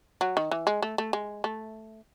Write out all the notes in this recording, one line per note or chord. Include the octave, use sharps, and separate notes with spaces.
F#3
D#3
E3
G#3
A3
A3
G#3
A3